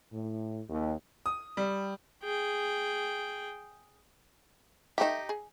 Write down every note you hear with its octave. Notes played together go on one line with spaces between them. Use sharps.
A2
D#2
D#6
G3
G#4 G5
G3 A3 D#4 G4 E5
G#4